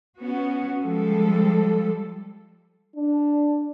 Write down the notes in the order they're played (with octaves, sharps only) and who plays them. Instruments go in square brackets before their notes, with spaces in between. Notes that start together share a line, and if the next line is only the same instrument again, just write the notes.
[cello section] B3 C#4 F#4
F3 G3 G#3 A4
[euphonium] D4